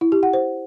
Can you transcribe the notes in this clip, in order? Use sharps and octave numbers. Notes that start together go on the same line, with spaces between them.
E4
G4
F#5
C5